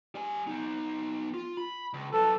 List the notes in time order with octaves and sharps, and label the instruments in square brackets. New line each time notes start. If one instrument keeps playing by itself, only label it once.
[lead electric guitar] G3 G#5
B3 D#4
F4
B5
C#2
[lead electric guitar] F#3 B4 [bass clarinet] A4